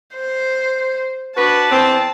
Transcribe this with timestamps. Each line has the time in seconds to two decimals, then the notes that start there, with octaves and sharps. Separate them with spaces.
0.15 C5
1.37 D4 F#4 B4 A5
1.71 E2 C4